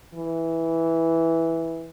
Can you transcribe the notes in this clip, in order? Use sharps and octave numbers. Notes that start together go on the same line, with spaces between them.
E3